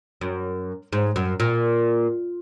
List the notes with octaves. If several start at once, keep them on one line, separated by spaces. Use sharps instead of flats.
F#2
G#2
F#2
A#2